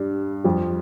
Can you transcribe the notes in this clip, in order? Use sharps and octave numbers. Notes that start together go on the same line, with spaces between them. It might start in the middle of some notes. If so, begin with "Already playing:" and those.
Already playing: G2 G3
F2 F3